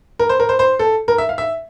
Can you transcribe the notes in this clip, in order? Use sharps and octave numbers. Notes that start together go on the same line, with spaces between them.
A#4
C5
A#4
C5
C5
A4
A#4
E5
F5
E5